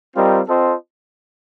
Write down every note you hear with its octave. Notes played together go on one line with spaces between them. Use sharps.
G3 C4 F4 A#4 D#5
C4 F4 A4 C5 D#5